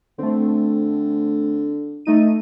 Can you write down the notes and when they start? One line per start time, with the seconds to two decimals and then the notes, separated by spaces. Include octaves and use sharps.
0.19 D3 A3 C4
2.06 A3 D#4 D#7